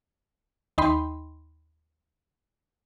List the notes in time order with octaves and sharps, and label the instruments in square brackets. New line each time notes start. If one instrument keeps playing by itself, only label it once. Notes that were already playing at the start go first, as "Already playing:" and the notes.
[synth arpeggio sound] D#2 D#4 D#5 G5 B5 C6